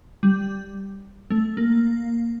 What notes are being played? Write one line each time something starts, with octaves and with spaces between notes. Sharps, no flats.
G3
A3
A#3